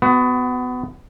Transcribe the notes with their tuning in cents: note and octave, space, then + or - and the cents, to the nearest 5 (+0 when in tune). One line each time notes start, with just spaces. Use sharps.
B3 +25 F#4 +0